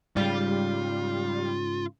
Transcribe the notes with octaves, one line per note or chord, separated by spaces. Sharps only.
G#2 C#3 G3 F4